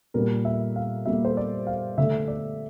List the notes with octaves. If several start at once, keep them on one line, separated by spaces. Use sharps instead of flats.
A#2 G3 A#3 A#4
E5
F5
A#2 G3 A#3 E5
C5
D5
F5
D3 A3 E5
D5